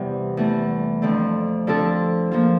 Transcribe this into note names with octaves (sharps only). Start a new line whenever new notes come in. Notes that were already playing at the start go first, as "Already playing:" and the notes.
Already playing: E2 C3 G3
E2 E3 A3
F2 D3 A3 C4
D3 F3 C4 F4 A4
F3 A#3 F4